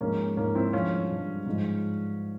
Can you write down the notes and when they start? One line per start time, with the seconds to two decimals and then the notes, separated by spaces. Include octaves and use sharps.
0.01 G#2 F3 G#3 A#3 C#4
0.37 G#2 F3 G#3 A#3 C#4
0.55 C4 E4
0.73 G2 F3 G#3 C#4 F4
1.10 G2 F3 G#3
1.46 G#2 F3 G#3